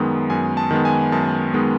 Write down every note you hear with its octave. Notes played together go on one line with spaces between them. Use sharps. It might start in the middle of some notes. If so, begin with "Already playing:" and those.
Already playing: F#2 D#3 G#3 B3
F#2 G#5
A5
D#3 G#3 B3
G#5
F#2 A5
D#3 G#3 B3